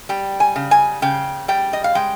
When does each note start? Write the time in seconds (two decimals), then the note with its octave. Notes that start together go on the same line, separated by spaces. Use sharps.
0.09 G3 G5
0.40 G#5
0.56 C#3
0.71 G#5
1.02 C#3 G5
1.48 G3 G5
1.73 D#5
1.84 F5
1.95 G#3 G5